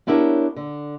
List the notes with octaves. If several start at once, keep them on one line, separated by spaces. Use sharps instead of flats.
B3 D4 E4 G4 A#4 C#5
D3